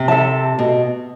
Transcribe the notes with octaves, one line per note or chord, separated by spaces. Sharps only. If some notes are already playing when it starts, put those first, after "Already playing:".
Already playing: C3
A4 E5 A5
B2